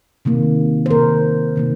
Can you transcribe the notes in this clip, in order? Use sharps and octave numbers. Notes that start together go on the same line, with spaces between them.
C3 D#3 A#3
C5
C3 D#3 A#3 A#4
C3 D#3 A#3